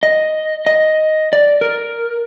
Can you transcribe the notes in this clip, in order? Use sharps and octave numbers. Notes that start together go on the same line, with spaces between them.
D#5
D#5
D5
A#4